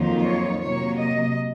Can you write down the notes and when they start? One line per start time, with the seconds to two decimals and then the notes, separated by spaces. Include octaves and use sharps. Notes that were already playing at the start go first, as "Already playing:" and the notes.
Already playing: F2 D#3 F#3 A#3 F4
0.23 C#5
0.61 C3 F#3 A#3 C#5
0.99 D#5